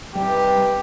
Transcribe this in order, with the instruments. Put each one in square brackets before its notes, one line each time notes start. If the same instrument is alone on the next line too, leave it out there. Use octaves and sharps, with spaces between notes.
[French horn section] C3 D#4 B4 [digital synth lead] G3 [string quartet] G4